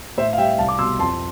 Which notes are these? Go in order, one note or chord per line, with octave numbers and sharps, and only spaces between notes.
A2 C5 E5
F5
G3 E5 G5
C2 F5 A5
D6
B2 G3 C6 E6
F2 A5 C6